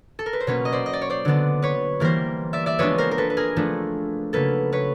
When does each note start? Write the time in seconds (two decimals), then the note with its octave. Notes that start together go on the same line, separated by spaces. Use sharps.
0.19 A4
0.26 A#4
0.33 B4
0.40 C5
0.47 B2 F#3 A#3 C#4 B4 C#5
0.65 D#5
0.72 C5 D5
0.86 D#5
0.93 D5
1.01 C#5
1.10 C5 D5
1.25 D3 F#3 B3 D4
1.62 B4 C#5
2.00 E3 G3 A#3 A#4 C5
2.53 D5 E5
2.66 D5 E5
2.79 F3 G#3 B3 D4 B4 C#5
2.98 A#4 C5
3.11 A#4
3.18 A4 B4
3.30 B4
3.37 G#4 A#4
3.56 F3 A3 D4
4.33 C#3 F#3 A#3 A4 B4
4.72 B4 C#5